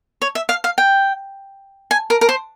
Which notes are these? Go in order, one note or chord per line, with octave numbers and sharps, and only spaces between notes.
C#5
E5
F5
F5
G5
G#5
A#4
A#4
C5